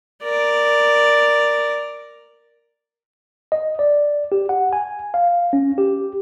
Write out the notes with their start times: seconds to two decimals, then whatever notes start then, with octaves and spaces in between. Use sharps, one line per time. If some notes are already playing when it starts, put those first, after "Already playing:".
0.23 A#4 D5
3.52 D#5
3.79 D5
4.32 G4
4.49 F#5
4.73 G#5
5.14 F5
5.53 C#4
5.78 G4